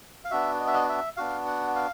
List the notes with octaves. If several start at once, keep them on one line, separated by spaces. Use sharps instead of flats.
F5
B3 D4 F#4 E5
D#5
E5
D#5
E5
B3 D4 F#4 F5
F#5
F5